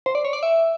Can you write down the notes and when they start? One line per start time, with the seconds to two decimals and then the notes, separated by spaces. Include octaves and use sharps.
0.06 C5
0.15 D5
0.25 C#5
0.33 D5
0.43 E5